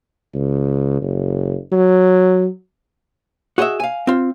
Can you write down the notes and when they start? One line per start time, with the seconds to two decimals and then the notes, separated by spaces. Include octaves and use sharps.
0.34 C#2
1.02 F#1
1.72 F#3
3.58 F#4 G#4 C5 D#5 E5
3.80 F5 G#5
4.07 C4 F4